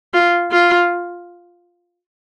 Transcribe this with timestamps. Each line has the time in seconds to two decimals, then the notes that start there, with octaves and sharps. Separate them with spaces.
0.14 F4
0.51 F4